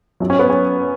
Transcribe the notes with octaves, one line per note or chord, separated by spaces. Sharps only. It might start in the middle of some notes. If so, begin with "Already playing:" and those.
F#2 F#3
C#4
B3
C#4